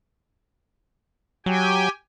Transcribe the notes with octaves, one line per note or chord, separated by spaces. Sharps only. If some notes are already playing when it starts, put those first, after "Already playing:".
F#3 G4 G5 G#5